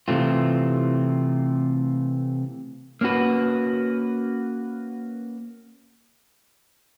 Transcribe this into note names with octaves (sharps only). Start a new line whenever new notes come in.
C3 E3 A3 C4 F4
A#3 C#4 F#4 B4